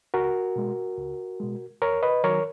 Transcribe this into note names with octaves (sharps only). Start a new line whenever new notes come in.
C#2 F#4 A#4
B2 G#3
C#2
B2 G#3
D#2 A#4 C#5
B4 D#5
D#3 F#3 A#4 C#5